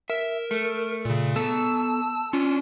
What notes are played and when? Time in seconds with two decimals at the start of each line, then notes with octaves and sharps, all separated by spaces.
0.10 A#4 E5
0.51 A3
1.05 A#2 C#3
1.36 B3 A4 A5 E6
2.33 C#4 D4 F4